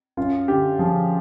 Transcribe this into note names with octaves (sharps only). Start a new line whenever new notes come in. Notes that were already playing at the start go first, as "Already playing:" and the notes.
F#2 F4
D3 G4
F3 G#4